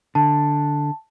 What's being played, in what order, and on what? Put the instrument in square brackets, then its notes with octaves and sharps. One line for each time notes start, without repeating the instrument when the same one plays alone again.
[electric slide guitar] D3 [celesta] A5